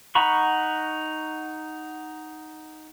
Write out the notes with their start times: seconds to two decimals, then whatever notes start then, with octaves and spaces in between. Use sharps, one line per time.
0.15 D#4 F#5 A#5 B5 C#6